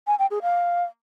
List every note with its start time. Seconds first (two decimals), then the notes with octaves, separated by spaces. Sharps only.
0.07 G#5
0.19 G5
0.31 G#4
0.42 F5